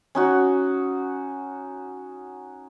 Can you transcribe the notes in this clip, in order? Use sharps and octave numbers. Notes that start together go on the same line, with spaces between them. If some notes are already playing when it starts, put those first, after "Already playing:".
C#4 D#4 F#4